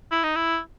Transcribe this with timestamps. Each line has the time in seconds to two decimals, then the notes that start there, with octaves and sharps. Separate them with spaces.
0.12 E4
0.24 D#4
0.36 E4